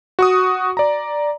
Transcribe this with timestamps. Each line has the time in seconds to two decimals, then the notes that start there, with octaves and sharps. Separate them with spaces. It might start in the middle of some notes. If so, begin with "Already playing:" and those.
0.19 F#4 C#6 D#6
0.77 D5 A#5